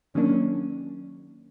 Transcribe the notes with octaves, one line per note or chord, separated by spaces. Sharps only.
D#3 F#3 A#3 C#4 D4